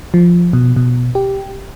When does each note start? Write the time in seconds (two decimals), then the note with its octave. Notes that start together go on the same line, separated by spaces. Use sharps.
0.14 F3
0.53 B2
0.76 B2
1.15 G4